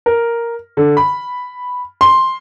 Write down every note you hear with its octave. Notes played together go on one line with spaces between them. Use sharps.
A#4
D3
B5
C6